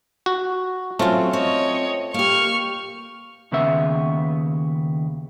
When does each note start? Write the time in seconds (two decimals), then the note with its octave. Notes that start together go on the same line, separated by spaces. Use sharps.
0.26 F#4
0.99 F#3 A3 C4 C#4 F4
1.33 C4 C#5 D#5
2.14 A#3 G4 C#6 F6
3.52 D#2 C#3 B3 E5